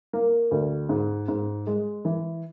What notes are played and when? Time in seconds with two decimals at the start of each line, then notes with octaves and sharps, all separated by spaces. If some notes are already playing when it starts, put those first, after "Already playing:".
0.13 A#3
0.51 D2
0.89 G#2
1.28 G#2
1.67 G#3
2.05 E3